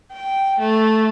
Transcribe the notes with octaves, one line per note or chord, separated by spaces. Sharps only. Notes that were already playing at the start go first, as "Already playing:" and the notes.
G5
A3